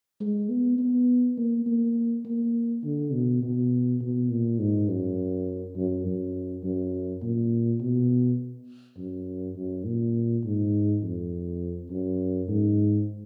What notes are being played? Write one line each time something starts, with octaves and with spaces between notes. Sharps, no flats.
G#3
B3
B3
A#3
A#3
A#3
D3
B2
B2
B2
A#2
G#2
F#2
F#2
F#2
F#2
A#2
B2
F#2
F#2
A#2
G#2
F2
F#2
G#2